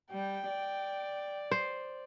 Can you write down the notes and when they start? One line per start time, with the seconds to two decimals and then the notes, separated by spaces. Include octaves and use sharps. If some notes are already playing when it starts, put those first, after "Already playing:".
0.11 G3 G5
0.49 D5
1.51 C5